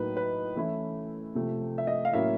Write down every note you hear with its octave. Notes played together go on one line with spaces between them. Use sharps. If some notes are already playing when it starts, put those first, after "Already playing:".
Already playing: A2 F#3 A#3 D#4 B4
B4
E3 A3 C#4 E4
C3 F3 A3
E5
D#5
F5
A2 F#3 A#3 C#4 E4 E5